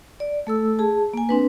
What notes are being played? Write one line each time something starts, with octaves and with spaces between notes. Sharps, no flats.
D5
A3 A4 E6
G#4 A5
A#3 G#5
C4 D4 B4